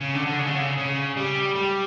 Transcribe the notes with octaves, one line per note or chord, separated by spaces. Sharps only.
C#3
D3
D3
C#3
D3
C#3
C#3
G3
G3